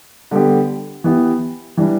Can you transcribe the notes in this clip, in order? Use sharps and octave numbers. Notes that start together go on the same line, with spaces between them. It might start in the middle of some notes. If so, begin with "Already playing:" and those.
D3 G3 B3 G4
E3 B3 G4
E3 G3 D4